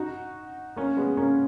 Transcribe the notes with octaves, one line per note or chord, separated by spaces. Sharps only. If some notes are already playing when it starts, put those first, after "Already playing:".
Already playing: D#4 F#4
A#3 C#4
G#3 B3
A#3 C#4